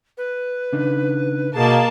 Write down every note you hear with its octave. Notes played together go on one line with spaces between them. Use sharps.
B4
C#3 D4 D#4
B2 A#3 G#4 A5